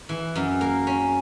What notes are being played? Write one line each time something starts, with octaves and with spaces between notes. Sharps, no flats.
E3
F#2
A#3
C#4